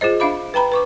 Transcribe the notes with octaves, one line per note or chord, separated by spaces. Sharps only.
F4 G#4 C5 D#5
D4 E5 F5 B5 D6
B4 G5 A#5 B5
B4 C#6 D6